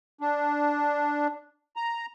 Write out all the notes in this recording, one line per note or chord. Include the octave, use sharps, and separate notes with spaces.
D4
A#5